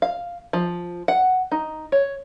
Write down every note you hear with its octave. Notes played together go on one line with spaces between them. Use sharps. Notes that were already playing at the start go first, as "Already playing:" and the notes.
F5
F3
F#5
D#4
C#5